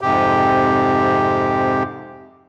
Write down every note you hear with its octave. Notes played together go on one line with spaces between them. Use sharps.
F2 G#2 C3 G4